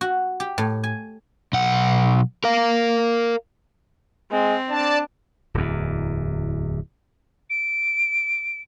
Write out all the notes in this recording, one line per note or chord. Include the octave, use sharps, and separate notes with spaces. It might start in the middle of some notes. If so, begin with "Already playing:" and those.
F#4
G4
A2
G#5
B1 F#5
A#4 F5
G#3 C4
D4 D5 A5
D1 E2
D7